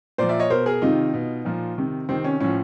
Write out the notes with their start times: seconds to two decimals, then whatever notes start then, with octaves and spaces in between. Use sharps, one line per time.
0.18 A#2 C5 D5
0.23 F3
0.29 D5 E5
0.39 C#5 D#5
0.50 B2 A#4 C5
0.66 G#4 A#4
0.82 C3 D#3 D#4 F4
1.14 B2
1.45 A#2 F3
1.77 C3 D#3
2.09 C3 D#3 C4
2.25 C#4
2.40 A2 F3 C#4